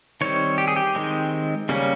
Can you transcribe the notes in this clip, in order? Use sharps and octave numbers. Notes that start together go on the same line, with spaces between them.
D#3 G3 C4 C#5
G4
G#4
G4
D#3 G#3 C4
C#3 G3 A#3 C#4